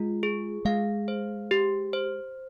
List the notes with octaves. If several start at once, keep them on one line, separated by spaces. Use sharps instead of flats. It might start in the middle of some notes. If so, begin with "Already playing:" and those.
Already playing: G#3 F4
G#4
G#3 F5
C5
G4
C5